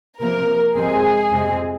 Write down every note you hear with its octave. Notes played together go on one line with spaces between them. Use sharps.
C3 F3 A#3 A#4
F2 C3 G#3 C4 G#4
F2 C3 G#3 C4